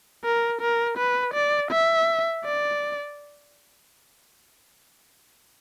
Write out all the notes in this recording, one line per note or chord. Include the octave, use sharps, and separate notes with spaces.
A#4
A#4
B4
D5
E5
D5